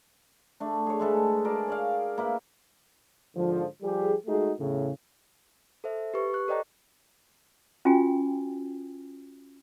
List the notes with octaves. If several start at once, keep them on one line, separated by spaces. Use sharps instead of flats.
A3 D4
G#4 C#5
G#3 A3 A4 B4
G#4 A#4 D5 A5
C#5 D5 F5
A#3 E4 B4
G#2 D3 F3
F3 G3 G4 G#4
G#3 A3 D#4 F#4 G#4
E2 A2 C#3
A4 C5 E5
G4 B4 C#6
C#6 F#6
A4 C5 D5 D#5 G5 A#5
C#4 F4 F#4 G5 G#5